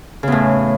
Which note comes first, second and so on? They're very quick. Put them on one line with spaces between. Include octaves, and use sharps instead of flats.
C#3 E2 A2